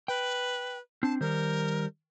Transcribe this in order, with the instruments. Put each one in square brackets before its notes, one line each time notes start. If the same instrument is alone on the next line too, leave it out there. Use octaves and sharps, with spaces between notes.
[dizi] B4 [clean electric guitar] G5
[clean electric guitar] C4 D4 [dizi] A5
[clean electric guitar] D#3 G3 C5 [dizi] A#4